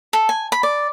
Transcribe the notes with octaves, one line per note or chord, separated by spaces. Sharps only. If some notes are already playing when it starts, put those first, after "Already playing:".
A4
G#5
B5
D5